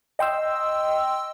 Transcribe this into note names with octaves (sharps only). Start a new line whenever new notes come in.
D#5 G5 C6 E6